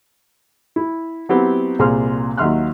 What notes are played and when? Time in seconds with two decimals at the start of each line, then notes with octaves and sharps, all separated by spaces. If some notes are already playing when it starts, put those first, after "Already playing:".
0.76 E4
1.29 F#3 B3 C4 E4 G4
1.79 C2 A#2 G#4 C5 C6 F6
2.37 D#2 F#3 E5 C6 F6 F#6